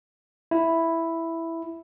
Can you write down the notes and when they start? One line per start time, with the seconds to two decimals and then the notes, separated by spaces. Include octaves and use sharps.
0.51 E4